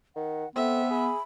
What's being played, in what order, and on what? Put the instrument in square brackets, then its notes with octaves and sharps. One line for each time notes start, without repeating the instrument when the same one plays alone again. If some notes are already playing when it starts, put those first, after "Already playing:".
[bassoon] D#3 [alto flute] F#5
[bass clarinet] B3 [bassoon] C4 [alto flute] A4 [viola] E5
[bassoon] G#4 [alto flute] B5